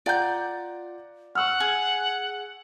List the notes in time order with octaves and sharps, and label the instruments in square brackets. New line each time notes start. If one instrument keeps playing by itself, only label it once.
[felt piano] F4 F#5 A#5 [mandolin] D5 G6
[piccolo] F#5 [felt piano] C#6 E6 F6
[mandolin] G#4